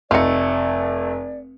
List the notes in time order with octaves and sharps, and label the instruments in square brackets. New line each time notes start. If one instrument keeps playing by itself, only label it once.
[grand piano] F1 C#7 [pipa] A3 [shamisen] D#4 F4 [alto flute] D5